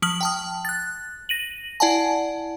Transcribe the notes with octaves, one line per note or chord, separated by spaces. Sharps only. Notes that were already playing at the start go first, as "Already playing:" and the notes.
F3 D#6 F6 F#7
G5 A5 D#6
F#6 A6
A#6 D#7 F#7
E4 D5 F#5 G#5 A5